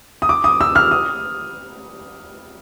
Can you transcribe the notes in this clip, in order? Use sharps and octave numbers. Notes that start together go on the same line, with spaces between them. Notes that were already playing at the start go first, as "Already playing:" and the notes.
D#6
D6
D#6
E6
F6
D#6